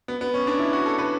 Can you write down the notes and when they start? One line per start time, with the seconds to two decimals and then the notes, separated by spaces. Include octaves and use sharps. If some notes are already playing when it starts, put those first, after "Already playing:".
0.08 B3
0.21 B3
0.34 C#4
0.47 D4
0.59 E4
0.73 F#4
0.86 A4
0.98 B4